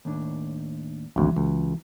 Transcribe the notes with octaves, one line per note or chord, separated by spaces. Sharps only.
D#2 A2 D4
G#1 D2 E3 F#3
C#2